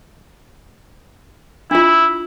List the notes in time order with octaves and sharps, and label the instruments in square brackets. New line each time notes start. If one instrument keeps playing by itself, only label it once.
[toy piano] D4 F4 [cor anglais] E4